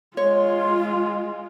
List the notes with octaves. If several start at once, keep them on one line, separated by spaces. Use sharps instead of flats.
G#3 F4 C#5 C6